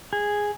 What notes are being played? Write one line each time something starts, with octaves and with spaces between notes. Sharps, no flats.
G#4